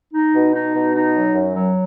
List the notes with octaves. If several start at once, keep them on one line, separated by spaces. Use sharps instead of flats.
D#4
B2
D#4
B2
D#4
F#3
F#2
F#3